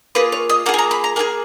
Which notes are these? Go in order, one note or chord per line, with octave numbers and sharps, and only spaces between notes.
A#3 F4 G#4 B4
C#5
D#5
A#3 F4 G#4 F#5
G#5
A#5
B5
A#5
A#3 F4 G#4 G#5